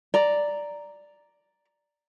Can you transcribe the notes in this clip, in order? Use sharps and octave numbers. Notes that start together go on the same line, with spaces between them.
D5 A#5